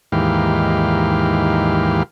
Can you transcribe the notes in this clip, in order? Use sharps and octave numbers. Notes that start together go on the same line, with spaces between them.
D#2 G#2 E3 G4 F5